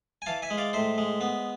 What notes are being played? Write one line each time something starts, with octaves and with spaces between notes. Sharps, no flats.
G#5
E3 F5 A5
E5 G#5
G#3
D5 F5
A2 C5 E5
G#3
B3